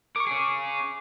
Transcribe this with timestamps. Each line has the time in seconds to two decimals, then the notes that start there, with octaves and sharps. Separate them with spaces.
0.16 A#4 C#6 D6
0.27 C#4 G#4